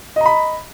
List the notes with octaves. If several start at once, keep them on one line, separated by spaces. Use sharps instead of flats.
D#5 A#5 B5